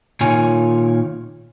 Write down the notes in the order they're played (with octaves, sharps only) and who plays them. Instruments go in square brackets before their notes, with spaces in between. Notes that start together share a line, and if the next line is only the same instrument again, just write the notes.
[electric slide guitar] A#2 D#3 F4 C#5 G#5